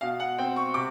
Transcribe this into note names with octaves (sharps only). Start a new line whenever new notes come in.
B2 F5
F#5
C4 G5
C#6
C3 D6